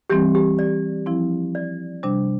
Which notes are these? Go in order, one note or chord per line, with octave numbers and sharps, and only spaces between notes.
E3 G3 C4 G4
G4
D5
F3 C4 E4
D5
C3 G3 D4